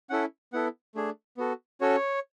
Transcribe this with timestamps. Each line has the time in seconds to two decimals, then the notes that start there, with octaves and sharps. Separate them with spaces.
0.10 C#4 E4 A4 F#5
0.53 B3 E4 A4 F#5
0.95 A3 D4 G#4
1.37 B3 F#4 A4
1.81 C#4 F#4 A4 C#5